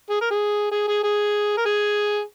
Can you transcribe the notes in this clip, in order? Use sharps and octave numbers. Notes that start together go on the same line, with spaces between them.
G#4
A#4
G#4
G#4
G#4
G#4
A#4
G#4